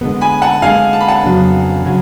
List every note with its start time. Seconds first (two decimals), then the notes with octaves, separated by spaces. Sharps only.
0.01 D3 G#3 B3
0.21 G#5 B5
0.42 F#5 A5
0.62 D3 G#3 B3 F5 G#5
0.93 A5
1.01 B5
1.08 F#5 A5
1.24 F2 C#3 F#3 B3 D4
1.86 C#3 F#3